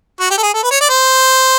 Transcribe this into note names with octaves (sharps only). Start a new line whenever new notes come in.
F#4
G4
A4
G#4
A4
B4
C#5
D5
C5